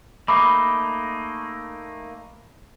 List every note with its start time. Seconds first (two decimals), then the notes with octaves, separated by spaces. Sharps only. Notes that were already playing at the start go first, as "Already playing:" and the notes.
0.28 A3 A#3 D#4 B5 D6